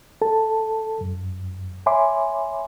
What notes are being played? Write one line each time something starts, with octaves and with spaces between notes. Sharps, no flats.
A4 A5
F#2
C#5 E5 G#5 B5 C6 D6